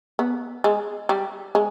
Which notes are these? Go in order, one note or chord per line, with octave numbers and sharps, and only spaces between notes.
B3
G#3
G3
G#3